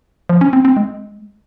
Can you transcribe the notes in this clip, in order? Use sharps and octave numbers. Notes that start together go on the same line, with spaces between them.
F3
C#4
C4
C4
G#3